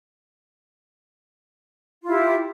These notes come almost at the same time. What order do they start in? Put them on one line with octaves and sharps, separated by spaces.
F4 E4 G4